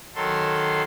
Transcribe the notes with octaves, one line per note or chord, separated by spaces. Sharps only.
D#3 F#3 A4 C6